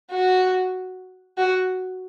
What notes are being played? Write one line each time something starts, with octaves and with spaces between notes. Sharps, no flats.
F#4
F#4